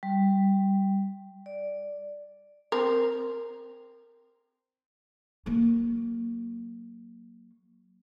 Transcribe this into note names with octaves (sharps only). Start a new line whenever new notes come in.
G3
D5
C4 A#4
F#3 A#3